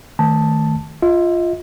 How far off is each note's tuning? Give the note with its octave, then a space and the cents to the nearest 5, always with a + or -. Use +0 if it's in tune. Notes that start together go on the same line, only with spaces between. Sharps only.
D#3 -5 A3 +0 A5 +0
F4 +0 D#5 +40